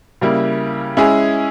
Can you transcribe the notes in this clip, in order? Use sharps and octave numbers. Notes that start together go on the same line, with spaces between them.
C#3 G3 A#3 E4
G#3 C#4 E4 G#4